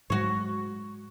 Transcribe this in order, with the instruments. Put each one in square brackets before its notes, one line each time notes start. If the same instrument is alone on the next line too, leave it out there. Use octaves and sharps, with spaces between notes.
[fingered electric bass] G#2 F#3 G#3 [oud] F#4 C#5